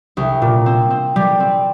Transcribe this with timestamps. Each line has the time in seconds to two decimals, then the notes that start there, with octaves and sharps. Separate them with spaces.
0.17 C2
0.42 A#2
0.66 C4
0.90 C4
1.16 G3
1.40 C4